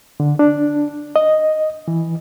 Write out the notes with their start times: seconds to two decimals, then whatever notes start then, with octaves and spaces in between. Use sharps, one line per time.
0.20 D3
0.39 D4
1.16 D#5
1.88 E3